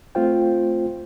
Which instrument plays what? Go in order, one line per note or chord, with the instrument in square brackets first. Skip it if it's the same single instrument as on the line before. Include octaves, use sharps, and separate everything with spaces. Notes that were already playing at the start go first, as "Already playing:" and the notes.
[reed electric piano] A3 C4 F4 C5 G5